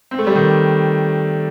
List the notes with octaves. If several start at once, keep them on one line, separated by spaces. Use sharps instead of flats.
C4
A3
G3
D#3